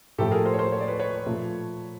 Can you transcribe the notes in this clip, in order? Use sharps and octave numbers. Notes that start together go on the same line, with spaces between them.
A2 F3 A3 G4 A4
G#4 A#4
A#4 C5
C#5
A#4 C5
C#5
D5
B4 C#5
B4 C#5
A#2 F3 A3